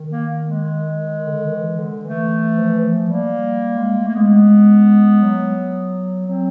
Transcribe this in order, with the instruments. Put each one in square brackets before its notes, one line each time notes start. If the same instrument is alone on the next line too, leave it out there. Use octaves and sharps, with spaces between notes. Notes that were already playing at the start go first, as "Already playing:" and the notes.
Already playing: [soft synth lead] D#3
[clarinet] A#3
G#3
[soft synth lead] D3
D#3
E3
D3
[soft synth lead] E3 [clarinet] A3
[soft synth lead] F3
E3
F3
[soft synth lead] G3 [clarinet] A#3
[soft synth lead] G3
G#3
A3
[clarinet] A#3
[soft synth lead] G#3 [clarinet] B3
[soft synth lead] F#3
[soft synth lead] F#3 [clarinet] C4